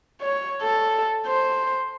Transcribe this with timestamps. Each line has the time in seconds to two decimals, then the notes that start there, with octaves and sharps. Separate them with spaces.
0.21 C#5
0.62 A4
1.26 C5